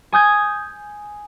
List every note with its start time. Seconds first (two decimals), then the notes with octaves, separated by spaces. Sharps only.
0.12 G#5 D#6 G6 G#6